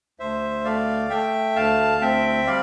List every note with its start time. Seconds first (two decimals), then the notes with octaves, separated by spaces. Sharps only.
0.20 D2 C5 E5
0.65 A3 D5 F5
1.10 A3 E5 G5
1.56 D2 F5 A5
2.02 C4 E5 G5
2.47 G3 D5 F5